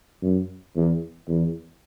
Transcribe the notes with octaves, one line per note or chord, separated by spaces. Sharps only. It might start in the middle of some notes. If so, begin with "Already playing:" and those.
F#2
E2
E2